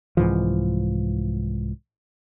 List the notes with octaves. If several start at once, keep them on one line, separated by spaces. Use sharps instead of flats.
C2 G#2 E3 F3